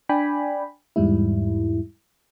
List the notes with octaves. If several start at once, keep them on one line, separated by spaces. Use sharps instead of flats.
D4 D5 G5 G#5 B5
E2 G#2 G3 E4